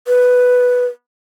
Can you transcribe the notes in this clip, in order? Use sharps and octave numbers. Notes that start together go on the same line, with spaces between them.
B4